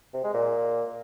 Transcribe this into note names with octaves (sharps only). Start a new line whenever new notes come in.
C3
G#3
A#2